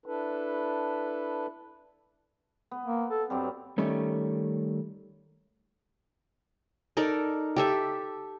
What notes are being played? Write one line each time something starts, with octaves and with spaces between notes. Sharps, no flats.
D4 E4 A4 B4
B3
A#3
A4
G2 F#3 G3 C4
D#3 G3 A3 C#4
D#4 A4 A#4 D5
G4 A4 E5